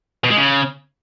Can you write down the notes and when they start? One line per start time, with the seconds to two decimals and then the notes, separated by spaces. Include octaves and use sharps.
0.24 B2
0.31 G#3
0.37 C#3